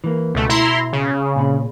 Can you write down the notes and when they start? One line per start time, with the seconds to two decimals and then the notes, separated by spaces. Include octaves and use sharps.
0.04 E3 A#3
0.34 C#2 B2 A3
0.49 E4 A#5 C6
0.93 C#3
1.36 A#2 C4 B5